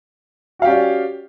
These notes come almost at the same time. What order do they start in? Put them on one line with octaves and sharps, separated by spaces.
F#4 F5 G4 C#4 D5